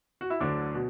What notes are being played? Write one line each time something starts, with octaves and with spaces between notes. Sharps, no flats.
F#4
E4
D2 D3 F#3 D4
B2 F#3